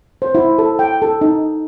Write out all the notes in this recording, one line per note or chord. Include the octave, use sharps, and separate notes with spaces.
C5
E4
A4
G5
A4
D#4